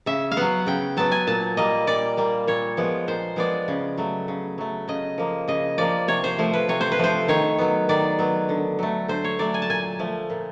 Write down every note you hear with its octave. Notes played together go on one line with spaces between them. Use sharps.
C#3 E5
F5
F#3 B3 F#5
C#3 G5
F#3 B3 A5
G#5
A#2 A5
G3 A#3 D#5
A#2 D5
G3 A#3
A#2 C#5
F3 G#3 B3
A#2 C5
F3 G#3 B3 D5
C#3
F#3 A3
C#3
F#3 A3
C#3 D#5
F3 A#3
C#3 D#5
F3 A#3 D5
C3 C#5
C5
F3 A3
B4
C3 C#5
C5
B4
F3 A3 C5
D#3 C#5
F#3 B3
D#3 D5
F#3 B3
D3
F#3 A3
D3 C5
C#5
F#3 A3 D5
G#5
A5
A#2 G#5
F3 A3
A#2